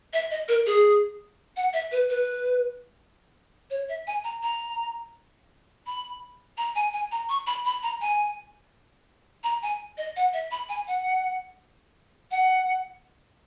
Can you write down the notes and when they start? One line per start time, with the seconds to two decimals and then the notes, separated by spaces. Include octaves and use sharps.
0.13 E5
0.31 D#5
0.48 A#4
0.66 G#4
1.57 F#5
1.73 E5
1.92 B4
2.09 B4
3.70 C#5
3.89 E5
4.07 G#5
4.24 A#5
4.43 A#5
5.87 B5
6.58 A#5
6.75 G#5
6.93 G#5
7.12 A#5
7.29 C#6
7.47 B5
7.65 B5
7.83 A#5
8.01 G#5
9.44 A#5
9.63 G#5
9.98 D#5
10.16 F#5
10.33 E5
10.51 B5
10.69 G#5
10.88 F#5
12.31 F#5